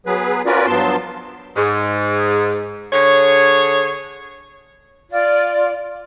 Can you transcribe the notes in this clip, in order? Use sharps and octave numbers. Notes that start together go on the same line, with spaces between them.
F#3 B3 G#4 B4
C#4 F4 F#4 A#4 B4 D5
G2 F3 F#3 B3 A5 C6
G#2
D3 G#4 C#5
F4 D5